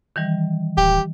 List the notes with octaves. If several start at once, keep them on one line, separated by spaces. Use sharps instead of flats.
D#3 E3 G3
D1 G4